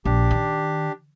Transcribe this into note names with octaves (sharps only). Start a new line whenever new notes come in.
A#1 D4 G4
D#3